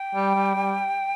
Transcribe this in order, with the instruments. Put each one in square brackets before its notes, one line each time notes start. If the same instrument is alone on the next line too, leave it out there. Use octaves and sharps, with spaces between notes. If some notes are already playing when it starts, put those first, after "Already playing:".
Already playing: [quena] G5
[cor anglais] G3
G3
G3